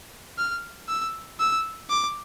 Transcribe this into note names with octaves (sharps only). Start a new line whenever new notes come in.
F6
E6
E6
D6